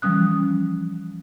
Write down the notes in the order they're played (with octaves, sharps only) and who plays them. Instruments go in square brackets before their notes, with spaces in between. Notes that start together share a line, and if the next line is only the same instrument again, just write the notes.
[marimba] E3 F3 G3 C#4 D#6 F#6